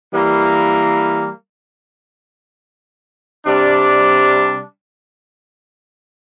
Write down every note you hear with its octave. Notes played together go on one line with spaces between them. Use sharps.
E3 G3 A#3
C3 G3 D4